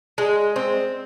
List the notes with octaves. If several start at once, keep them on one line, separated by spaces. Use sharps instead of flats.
G#3
C4